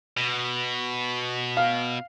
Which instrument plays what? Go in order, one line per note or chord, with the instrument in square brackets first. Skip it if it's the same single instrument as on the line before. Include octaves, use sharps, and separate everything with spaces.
[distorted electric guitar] B2
[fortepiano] F5